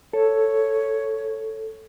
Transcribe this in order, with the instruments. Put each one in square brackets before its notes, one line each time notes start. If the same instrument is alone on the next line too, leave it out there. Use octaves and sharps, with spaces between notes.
[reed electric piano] A4 [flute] C#5